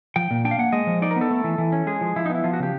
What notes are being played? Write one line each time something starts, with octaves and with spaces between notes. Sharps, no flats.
F3 G5
A#2
D4 G5
F5
A#3 F#5
G#3 D#5
F3
D#4 D5
A#4
B3
A4
A3
E3
E3
C#4
G#3 G#4
F3
F3 E4
D#4
B3 E4
F3 F4
F#4
C#3 G4